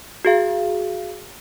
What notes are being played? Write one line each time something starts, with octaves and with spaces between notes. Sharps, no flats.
F#4 G#4 F5